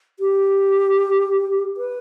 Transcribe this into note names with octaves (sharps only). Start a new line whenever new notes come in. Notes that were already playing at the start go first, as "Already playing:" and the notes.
G4
B4